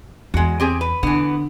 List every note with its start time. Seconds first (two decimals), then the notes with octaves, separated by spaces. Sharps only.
0.34 E2 G#3 F#4
0.60 C4 G4 G#4
0.81 B4
1.03 D3 E3 B3